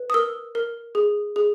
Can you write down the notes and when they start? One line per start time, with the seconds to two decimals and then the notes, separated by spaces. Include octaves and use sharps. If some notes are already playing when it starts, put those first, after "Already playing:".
Already playing: B4
0.10 D#6
0.14 A#4 E6
0.55 A#4
0.95 G#4
1.36 G#4